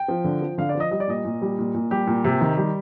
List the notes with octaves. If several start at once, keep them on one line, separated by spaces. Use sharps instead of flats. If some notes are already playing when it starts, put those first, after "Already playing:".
Already playing: G5
F3
D3
F3
D3 F5
D5
F3
D#5
G3 D#5
D5
A#2 D#5
A#2
G3
A#2
A#2
G3 G4
A#2
C3
D#3
G3